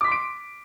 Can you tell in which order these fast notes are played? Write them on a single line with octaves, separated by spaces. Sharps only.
D6 B6 C6 D7